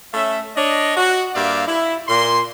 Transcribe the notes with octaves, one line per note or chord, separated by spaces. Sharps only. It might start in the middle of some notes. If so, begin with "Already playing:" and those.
A3 C#4 E5
D4 C#5 D#5
F#4
G2 A#3 D5 E5 F5
E4
A#2 C6